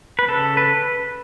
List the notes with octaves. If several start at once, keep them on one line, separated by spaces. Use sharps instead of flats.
B4
C#3 A4
B4